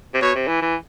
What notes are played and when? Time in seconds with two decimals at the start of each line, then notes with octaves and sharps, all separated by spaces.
0.14 C3
0.21 B2 C#5
0.35 C3
0.47 E3
0.62 E3